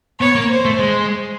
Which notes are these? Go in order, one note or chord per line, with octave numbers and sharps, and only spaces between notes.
B3 C#5
A#3
C5
A3
G#3